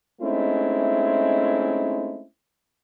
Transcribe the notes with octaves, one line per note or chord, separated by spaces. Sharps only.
G#3 A3 C4 C#4 D#4 E4